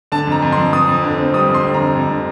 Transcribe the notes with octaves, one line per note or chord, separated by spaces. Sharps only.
D3 A5
F2 A#5
F2
C6
F2
F2 D#6
F2
D3
C4
G3 D#6
F2
C6
D3
A#5
F2
F2
D3